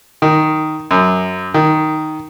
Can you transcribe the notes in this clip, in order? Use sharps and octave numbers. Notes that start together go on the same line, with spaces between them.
D#3
F#2
D#3